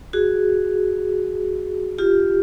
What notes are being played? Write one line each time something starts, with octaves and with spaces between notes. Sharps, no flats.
F#4 G#4
F4 G4